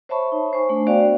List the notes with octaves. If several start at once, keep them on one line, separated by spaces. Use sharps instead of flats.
C5 C#5 E5 A5 B5 C#6
D#4
C5 G#5 C#6
A3 D4
B3 F#4 C5 D5 F5 G5